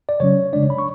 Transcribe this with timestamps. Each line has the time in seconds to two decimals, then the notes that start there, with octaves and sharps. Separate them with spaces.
0.09 D5
0.20 C#3 F#3 C#4 C#5
0.53 C#3 G#3 D4 D5
0.70 B5
0.78 C#6